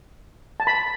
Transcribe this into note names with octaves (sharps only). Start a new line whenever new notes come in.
A5
B5